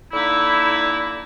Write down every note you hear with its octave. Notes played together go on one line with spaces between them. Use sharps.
D3 A#3 D#4 E4